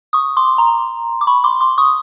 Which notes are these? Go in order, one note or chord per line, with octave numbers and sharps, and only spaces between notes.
C#6 D#6
C6 D6
A#5 C6
D6
B5 C#6
C6 D6
C6 D6
C#6 D#6